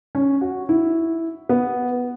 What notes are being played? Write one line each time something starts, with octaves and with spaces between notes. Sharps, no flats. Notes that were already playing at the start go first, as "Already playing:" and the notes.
C#4
F#4
E4
B3